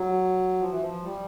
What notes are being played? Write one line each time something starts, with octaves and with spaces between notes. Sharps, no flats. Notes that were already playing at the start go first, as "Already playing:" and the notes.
Already playing: F#3
F3
E3
F3
G3